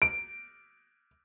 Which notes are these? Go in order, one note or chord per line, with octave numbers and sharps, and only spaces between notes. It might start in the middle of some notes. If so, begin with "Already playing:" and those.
D7